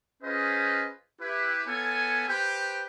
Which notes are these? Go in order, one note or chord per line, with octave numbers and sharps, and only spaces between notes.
C#4 F4 G#4 B4 C5 D#5
E4 G4 B4
B3 F4 A4 C#5 G#5
G4 B4 C5 G5